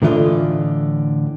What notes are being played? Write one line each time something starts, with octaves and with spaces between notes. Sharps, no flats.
A2 D3 E3 G3 F4 D#5